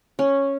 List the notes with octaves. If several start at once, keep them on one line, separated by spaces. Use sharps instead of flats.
C#4